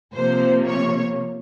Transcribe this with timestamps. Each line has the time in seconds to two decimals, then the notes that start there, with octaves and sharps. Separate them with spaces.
0.13 C3 F3 A#3 C5
0.66 C#5